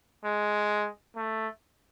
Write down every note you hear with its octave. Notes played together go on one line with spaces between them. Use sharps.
G#3
A3